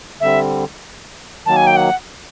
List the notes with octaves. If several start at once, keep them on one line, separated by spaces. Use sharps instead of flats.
D3 G3 C4 E5
D#3 F#3 A#3 A5
G#5
G5
F#5